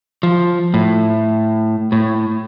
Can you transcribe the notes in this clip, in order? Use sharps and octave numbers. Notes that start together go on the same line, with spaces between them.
F3
A2
A2